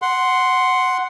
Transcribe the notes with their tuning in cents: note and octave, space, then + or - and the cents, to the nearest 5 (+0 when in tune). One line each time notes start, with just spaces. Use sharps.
F#5 +0 C6 +0